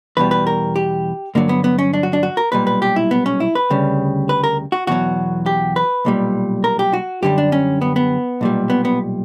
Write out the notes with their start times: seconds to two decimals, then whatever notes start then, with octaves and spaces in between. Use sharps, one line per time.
0.17 E2 B2 G3 B4
0.31 B4
0.47 A#4
0.76 G4
1.35 G2 D3 F#3 A#3
1.49 B3
1.64 B3
1.78 C#4
1.93 D4
2.03 F#4
2.13 D4
2.23 F#4
2.37 A#4
2.52 B1 A#2 G3 B4
2.67 B4
2.82 G4
2.96 E4
3.11 B3
3.26 C#4
3.40 E4
3.55 B4
3.70 D2 C#3 G3
4.29 B4
4.44 A#4
4.72 F#4
4.87 E2 B2 F#3 F#4
5.46 G4
5.76 B4
6.05 B1 A#2 G3
6.64 A#4
6.79 G4
6.93 F#4
7.22 F#2 D3 G3 G4
7.38 D4
7.52 C#4
7.81 B3
7.96 B3
8.41 B1 A#2 G3
8.70 B3
8.85 B3